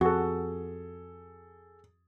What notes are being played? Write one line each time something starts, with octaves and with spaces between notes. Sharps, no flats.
F2 F#4 G#4 A4